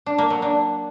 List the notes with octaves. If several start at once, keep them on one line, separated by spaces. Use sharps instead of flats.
D4
A#3
F#3
D4